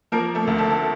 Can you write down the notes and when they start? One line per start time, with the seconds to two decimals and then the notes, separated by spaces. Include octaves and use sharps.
0.12 F3 A#3 A#4
0.35 A3 A4
0.47 D2
0.58 A3 A4
0.70 A4